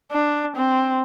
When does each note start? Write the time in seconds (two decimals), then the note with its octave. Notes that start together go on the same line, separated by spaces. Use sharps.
0.12 D4
0.56 C4